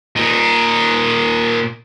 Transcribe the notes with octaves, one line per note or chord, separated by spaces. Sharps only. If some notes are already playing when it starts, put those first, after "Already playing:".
A#2 D#4